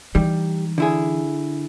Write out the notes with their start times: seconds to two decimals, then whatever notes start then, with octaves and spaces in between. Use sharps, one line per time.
0.15 E3 G3 D#4
0.78 D3 E4 G#4